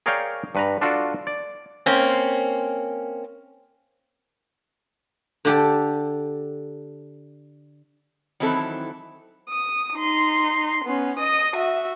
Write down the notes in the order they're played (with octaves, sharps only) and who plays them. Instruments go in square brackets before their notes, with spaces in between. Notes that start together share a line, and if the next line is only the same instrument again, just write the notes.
[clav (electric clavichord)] G#4 A#4 C#5 D5 F5 G5
G2 B4 A#5
D4 F4 F#4 A4 D5
D5
[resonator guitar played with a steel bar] A#3 C4 C#4
[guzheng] D3 G4 A4
[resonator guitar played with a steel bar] D#3 E3 F#3 C4 E4 A4
[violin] D#6
D#4 C6
B3 C#4
D#5 D#6
F#4 E5